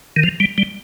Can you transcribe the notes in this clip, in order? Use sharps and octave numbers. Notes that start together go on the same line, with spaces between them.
D#3
F3
G3
G3